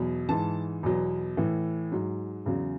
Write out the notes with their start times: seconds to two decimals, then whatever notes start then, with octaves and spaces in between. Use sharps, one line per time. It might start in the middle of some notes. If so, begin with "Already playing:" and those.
Already playing: E2 B2 F#3
0.29 G#2 E3 A5
0.83 E2 B2 F#3
1.37 A2 E3
1.92 G#2 F#3
2.46 E2 C#3 F#3